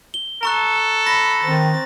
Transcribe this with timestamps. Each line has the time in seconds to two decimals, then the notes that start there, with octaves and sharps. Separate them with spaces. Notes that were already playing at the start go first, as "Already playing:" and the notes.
0.14 G7
0.43 A4 A#5 C#6 F#6
1.07 B5 A#6
1.43 D#3 C4 A6